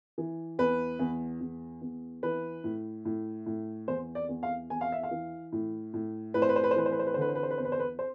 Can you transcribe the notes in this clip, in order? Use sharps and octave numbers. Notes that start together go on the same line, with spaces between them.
E3
E2 B4
E2
E2
E2
E3 B4
A2
A2
A2
E2 C5
D5
E2
F5
E2 G#5
F5
E5
F5
E3
A2
A2
A2 B4
C5
B4
C5
B4
C5
E3 B4
C5
B4
C5
B4
C5
D3 B4
C5
B4
C5
B4
E2 C5
B4
C5
B4
C5